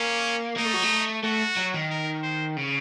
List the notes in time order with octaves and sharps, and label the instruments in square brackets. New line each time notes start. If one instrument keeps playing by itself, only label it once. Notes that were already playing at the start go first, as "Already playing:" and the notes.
Already playing: [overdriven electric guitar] A#3 [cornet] C#4
[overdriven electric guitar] A#3 [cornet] D#4
[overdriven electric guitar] A3
F#3
A3
[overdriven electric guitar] A3 [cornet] F#4
[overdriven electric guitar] F#3
D#3
[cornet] A#4
C5
[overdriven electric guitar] C#3